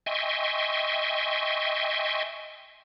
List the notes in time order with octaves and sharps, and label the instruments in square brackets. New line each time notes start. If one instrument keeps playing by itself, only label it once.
[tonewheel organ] D#5 E5 G5 G#5 C6 C#6